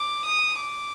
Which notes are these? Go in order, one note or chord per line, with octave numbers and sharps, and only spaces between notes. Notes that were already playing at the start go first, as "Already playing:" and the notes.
Already playing: D6
D#6
D6